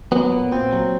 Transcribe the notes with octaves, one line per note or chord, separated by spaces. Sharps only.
F#3 B3
A#2
A#2 C4
F#3